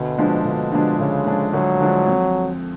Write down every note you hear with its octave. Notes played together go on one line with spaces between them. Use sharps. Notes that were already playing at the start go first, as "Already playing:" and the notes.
Already playing: D2 B2
D3 F3 G#3 D4
D2 B2
D3 F3 G#3 D4
D2 C#3
D3 F3 G#3 D4
D2 F#3
D3 F3 G#3 D4
F2